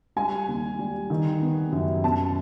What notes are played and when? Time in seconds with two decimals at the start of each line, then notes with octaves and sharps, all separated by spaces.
0.16 G3 G#5
0.48 D#2
0.79 G3
1.10 D#3
1.42 B3
1.72 F#2
2.04 B2 A5